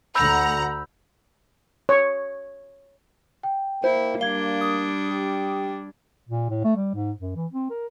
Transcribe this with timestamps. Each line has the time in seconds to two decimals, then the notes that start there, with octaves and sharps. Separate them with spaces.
0.15 D2 F#5 A#5 B5 E6 G6
1.89 C#5
3.43 G5
3.84 A#3 E4 C5
4.21 G3 D4 F5 G#6 G7
4.61 D#6
5.11 G4
6.29 A#2
6.50 A2
6.64 A3
6.76 G3
6.95 G#2
7.20 F#2
7.36 E3
7.53 C4
7.70 A#4